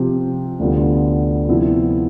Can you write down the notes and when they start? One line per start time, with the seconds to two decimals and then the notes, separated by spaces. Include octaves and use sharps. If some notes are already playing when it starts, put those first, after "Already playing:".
Already playing: C3 F3 C4 G4
0.59 D2 D3 G3 B3 F4
1.49 C3 F3 B3 E4